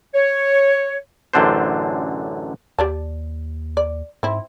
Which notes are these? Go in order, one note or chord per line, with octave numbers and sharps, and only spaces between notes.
C#5
A1 F#2 D3 D4 C5
D#2 G4 D5 A5
D5
G#2 C4 E4